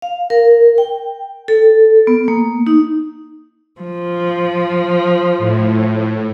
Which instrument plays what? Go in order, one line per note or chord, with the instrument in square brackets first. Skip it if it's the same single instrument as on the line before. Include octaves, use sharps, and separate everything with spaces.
[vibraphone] F5
A#4
G5
A4
B3
A#3
D#4
[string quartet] F3
[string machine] A2